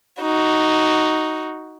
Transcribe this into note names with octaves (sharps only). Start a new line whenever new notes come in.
D#4 F#4